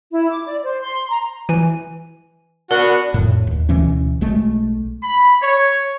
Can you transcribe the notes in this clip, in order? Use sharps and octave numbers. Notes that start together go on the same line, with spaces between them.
E4
D6
D5
C5
C6
A#5
E3 G#5
B3 D4 F#4 A#4 F#5
F2 A2
D#2
D2 B2 E3 C#4
B1 G#3 A3
B5
C#5